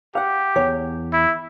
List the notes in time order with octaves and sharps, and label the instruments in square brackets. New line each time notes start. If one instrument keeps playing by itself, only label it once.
[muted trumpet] G4 [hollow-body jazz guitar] F5 F#5
[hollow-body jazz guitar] E2 C#5
[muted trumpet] E4